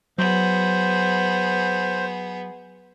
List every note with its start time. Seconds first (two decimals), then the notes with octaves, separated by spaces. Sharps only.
0.18 F#3 B3 G#4 C5